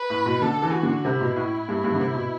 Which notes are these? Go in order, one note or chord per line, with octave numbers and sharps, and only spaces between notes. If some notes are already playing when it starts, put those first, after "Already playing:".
Already playing: B4
A2
B2
D3 A4
E3
F#4
D3
C3 E4
B2
A2
G2
G2
D3
C3
B2